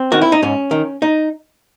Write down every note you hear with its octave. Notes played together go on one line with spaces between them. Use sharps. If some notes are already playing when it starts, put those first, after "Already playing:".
Already playing: C4
D#3 F#4
E4
D#4
G#2 C#4
D#3
D#4